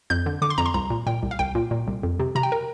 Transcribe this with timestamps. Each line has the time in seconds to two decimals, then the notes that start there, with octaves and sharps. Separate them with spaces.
0.10 F2 G6
0.26 D3
0.42 D3 D6
0.50 C6
0.58 F2 A#5
0.66 C6
0.74 C2 A#5
0.90 A#2
1.07 A#2 G5
1.23 C2
1.31 F5
1.39 C2 G5
1.55 A#2
1.71 A#2
1.87 C2
2.03 F2
2.20 C3
2.35 C3 A#5
2.43 G5
2.52 A#4